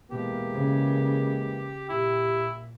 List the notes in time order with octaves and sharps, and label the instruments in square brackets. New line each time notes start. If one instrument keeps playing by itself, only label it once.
[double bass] B2 [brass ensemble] E3 G#3 A#3 [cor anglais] G4
[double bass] C#3
[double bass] A#2 [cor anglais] E4 [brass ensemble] G4